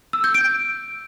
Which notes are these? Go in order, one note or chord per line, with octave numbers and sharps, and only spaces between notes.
E6
G6
D7